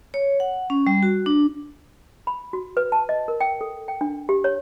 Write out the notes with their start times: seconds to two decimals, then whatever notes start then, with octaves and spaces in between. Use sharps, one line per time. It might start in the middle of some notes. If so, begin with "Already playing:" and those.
0.14 C#5
0.40 F#5
0.70 C#4
0.87 G3
1.03 F#4
1.26 D4
2.27 B5
2.53 F#4
2.77 B4
2.92 A5
3.09 D#5
3.28 A#4
3.40 G5
3.61 A4
3.88 G5
4.01 D4
4.29 G4
4.44 C#5